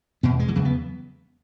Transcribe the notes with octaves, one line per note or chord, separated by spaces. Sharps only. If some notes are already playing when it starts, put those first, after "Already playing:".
E2 B2 B3
G#3
E3
E2 C#3 F#3
B3